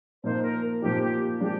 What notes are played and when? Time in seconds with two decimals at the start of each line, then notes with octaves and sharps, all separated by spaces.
0.24 A#2 F3 A#3 D#4 C5
0.43 A#4
0.82 A#2 F3 A#3 D#4 G4
1.02 G4
1.40 F3 G#3 D4 G4